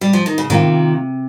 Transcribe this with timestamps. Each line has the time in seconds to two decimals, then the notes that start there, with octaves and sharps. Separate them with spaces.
0.01 G3
0.13 F3
0.26 D#3
0.38 C#3
0.50 C3 D#3 A#3 F4